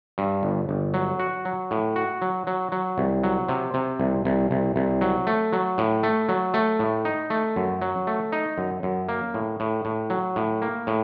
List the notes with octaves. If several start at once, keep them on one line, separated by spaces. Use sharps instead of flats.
G2
G1
G1
F#3
F#4
F#3
A2
F#4
F#3
F#3
F#3
C2
F#3
C3
C3
C2
C2
C2
C2
F#3
A3
F#3
A2
A3
F#3
A3
A2
D#4
A3
F#2
F#3
A3
D#4
F#2
F#2
A#3
A2
A2
A2
F#3
A2
A#3
A2